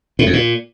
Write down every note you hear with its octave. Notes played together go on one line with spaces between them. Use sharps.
A2
F2
A#2